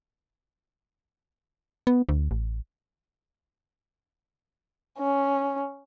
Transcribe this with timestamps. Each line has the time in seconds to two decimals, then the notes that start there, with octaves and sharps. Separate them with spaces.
1.87 B3
2.09 D2
2.31 A1
4.99 C#4